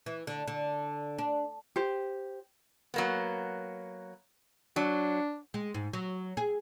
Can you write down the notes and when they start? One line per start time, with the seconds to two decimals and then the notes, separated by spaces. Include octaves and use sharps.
0.06 E3
0.27 D3
0.47 D3
1.18 D4
1.76 G4 C5
2.94 F#3 A#3 B3
4.76 F#3 D4
5.54 G#3
5.74 G#2
5.93 F#3
6.37 G#4